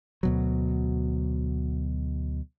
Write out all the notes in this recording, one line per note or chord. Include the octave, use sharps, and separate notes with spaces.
D2 B2 F#3